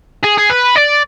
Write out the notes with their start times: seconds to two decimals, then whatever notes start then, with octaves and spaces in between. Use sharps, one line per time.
0.24 G#4
0.38 G#4
0.50 B4
0.76 D5